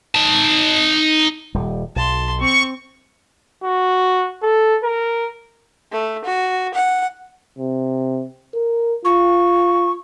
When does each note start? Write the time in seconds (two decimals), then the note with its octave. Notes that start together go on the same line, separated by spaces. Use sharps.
0.15 D#4 A5
1.54 D#1 G3
1.96 B1 A5 C6
2.41 C4 C#6
3.64 F#4
4.43 A4
4.83 A#4
5.92 A3
6.25 F#4
6.75 F#5
7.58 C3
8.54 A#4
9.05 F4 C#6